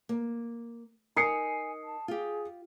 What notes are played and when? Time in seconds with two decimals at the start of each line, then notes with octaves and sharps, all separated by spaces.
0.09 A#3
1.16 D#4 A#4 G#5 D#6 C7 C#7
1.83 A5
2.08 F4 G4 G#4